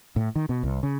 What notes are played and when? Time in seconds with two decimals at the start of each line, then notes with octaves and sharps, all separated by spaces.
0.16 A2
0.35 D#3
0.49 B2
0.63 C2
0.83 C#3